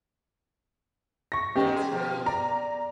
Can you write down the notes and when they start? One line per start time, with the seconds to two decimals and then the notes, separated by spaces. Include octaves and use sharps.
1.32 C#6 A#6
1.56 G2 D#3 A3 B3 C#4 G4 D#5
1.76 G#4 C6
1.92 B2 F3 B3
2.26 D5 A#5